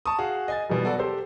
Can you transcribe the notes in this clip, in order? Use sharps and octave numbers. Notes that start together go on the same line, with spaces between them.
A5 C#6 D#6
F#4 G#4 F5
D#5 G#5 A6
B2 E3 G3
F#3 B3 F#4 A4 D5
G4 A4 C5